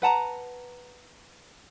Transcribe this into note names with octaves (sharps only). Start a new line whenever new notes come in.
B4 F#5 A5 A#5